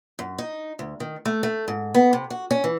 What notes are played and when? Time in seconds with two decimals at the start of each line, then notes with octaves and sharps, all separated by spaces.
0.19 F#2
0.38 D#4
0.79 D2
1.00 D#3
1.25 A3
1.43 A3
1.68 G#2
1.94 B3
2.13 C3
2.30 F#4
2.51 C#4
2.64 E3